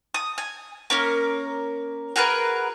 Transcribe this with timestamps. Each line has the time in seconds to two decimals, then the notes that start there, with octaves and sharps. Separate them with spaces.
0.14 D#6
0.38 G#5
0.90 A#3 C#4 A#4
2.16 F#4 G#4 A#4 B4